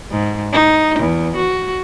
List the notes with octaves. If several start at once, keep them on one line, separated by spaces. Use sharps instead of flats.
G#2
D#4
E2
F#4